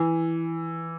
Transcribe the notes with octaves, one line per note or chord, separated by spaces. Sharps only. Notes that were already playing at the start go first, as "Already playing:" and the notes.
Already playing: E3